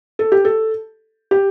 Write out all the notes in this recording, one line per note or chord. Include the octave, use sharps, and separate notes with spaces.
A4
G4
A4
G4